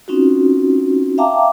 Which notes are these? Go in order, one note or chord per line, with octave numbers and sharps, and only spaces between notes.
C4 C#4 D#4 F4 F#4
E5 F5 G5 A5 A#5 D6